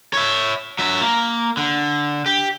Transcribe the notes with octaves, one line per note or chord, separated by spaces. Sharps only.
C#5 E5
F#3 E5
A#3
D3
G4